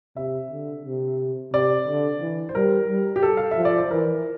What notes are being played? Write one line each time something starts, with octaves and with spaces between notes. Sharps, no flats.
C3 E5
D3
C3
C3 D5
D3
E3
C5
G3 A#4
G3
G4
A4
F5
E5
F3
D5
C5
E3 A#4